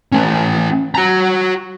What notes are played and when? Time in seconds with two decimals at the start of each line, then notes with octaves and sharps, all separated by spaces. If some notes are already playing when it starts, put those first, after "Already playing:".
0.12 A3 C#4
0.95 F#4 A#5